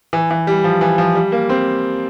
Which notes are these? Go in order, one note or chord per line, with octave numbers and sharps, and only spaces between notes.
E3
E3
G3
F3
E3
F3
G3
A#3
C4